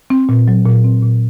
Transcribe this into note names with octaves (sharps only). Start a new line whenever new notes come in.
C4
A#2
F#3
A#2
C4
A#2